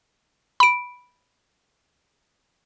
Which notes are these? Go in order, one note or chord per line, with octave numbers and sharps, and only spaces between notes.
B5 D7